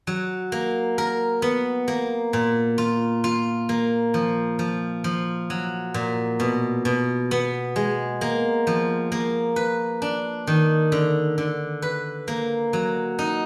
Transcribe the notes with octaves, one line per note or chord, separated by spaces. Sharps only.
F#3
A#3
A#4
B3
A#3
A#2
F4
F4
A#3
F3
F3
F3
F#3
A#2
B2
B2
B3
G#3
A#3
F3
A#3
B4
D4
D#3
D3
D3
B4
A#3
F#3
D#4